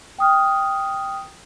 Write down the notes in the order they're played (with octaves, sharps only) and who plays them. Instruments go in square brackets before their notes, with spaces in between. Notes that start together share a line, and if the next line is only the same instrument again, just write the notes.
[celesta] G5 D#6 F6